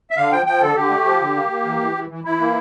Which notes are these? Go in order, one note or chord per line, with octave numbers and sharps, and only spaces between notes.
E5
D3 F5
F3 G5
F3 G5
D3 A4
D3 G4
A3
F3
D3
A#3
A#3
E3
E3
E3
E3
E3 E4
A#3